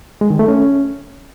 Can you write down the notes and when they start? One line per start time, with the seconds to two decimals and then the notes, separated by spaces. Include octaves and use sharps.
0.21 G#3
0.30 D#3
0.39 A3
0.48 C#4